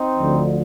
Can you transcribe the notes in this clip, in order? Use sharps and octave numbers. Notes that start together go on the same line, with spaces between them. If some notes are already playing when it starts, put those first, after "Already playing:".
Already playing: C4 D#4
D2 D3 F3